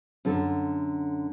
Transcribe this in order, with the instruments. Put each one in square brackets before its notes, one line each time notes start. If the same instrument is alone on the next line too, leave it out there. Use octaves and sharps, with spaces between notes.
[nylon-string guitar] F#2 D3 A4